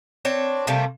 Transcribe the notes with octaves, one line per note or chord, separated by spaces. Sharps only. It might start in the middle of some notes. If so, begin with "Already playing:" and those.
C4 D4 C#5
C3 G3 A3 A#3